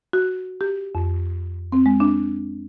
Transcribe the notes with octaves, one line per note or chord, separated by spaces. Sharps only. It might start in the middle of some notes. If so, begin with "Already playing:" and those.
F#4
G4
F2
C4
G#3
D4